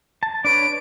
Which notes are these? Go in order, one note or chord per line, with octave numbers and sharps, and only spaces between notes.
A5
D4 B4 C#5 D7